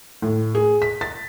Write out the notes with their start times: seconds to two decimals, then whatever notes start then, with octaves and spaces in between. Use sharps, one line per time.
0.22 A2
0.55 G#4
0.82 B6
1.01 A6